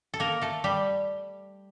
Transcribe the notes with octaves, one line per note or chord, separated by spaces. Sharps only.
A4
A#3 A#4
A3 A4
G3 G4